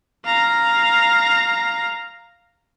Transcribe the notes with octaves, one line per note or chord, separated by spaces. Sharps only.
F5 A#5